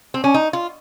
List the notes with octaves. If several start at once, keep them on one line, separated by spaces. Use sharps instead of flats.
C4
C#4
D#4
F4